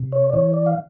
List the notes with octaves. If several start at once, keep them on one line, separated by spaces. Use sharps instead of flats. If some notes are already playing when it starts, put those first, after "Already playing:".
Already playing: C3
C#5
D5
E3 C#5
D5
F5